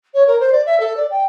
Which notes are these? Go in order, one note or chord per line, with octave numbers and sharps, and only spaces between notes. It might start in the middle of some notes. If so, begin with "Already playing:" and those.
C#5
A#4
C5
D5
E5
A4
D5
G5